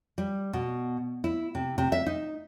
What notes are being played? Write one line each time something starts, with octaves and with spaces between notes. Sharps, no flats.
G3
B2
E4
C3
C3
E5
D#4